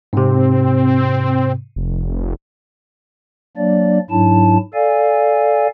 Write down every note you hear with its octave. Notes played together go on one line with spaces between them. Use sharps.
G#2 C3 C4
F1
F#3 A#3 D4 D5
G#2 F#3 D4 E4 A5
A4 D5 F5 G#5